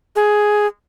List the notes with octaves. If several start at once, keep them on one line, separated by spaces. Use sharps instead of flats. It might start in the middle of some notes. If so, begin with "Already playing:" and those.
G#4